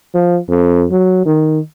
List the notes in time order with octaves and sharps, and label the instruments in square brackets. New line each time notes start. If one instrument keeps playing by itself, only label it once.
[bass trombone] F3
F2
F#3
D#3